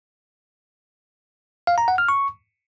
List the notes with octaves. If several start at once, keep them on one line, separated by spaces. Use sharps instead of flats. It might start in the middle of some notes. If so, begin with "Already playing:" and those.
F5
A#5
F#5
F6
C#6